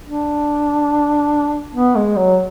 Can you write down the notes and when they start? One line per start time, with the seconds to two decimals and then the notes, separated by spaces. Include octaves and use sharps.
0.05 D4
1.75 B3
1.95 G#3
2.17 F#3